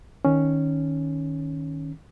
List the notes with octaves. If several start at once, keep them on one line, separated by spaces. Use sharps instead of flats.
D#3 C#4